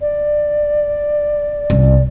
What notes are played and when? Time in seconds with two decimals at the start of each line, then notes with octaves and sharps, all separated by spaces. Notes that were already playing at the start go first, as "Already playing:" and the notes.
0.01 D5
1.70 C2 C#4